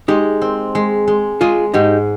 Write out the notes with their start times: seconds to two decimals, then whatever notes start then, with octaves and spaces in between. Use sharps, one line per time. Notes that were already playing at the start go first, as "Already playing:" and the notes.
0.08 G#3 D#4 G4
0.42 C4
0.75 G#3
1.07 G#3
1.41 G#3 F4 G#4
1.74 G#2 D#4 G4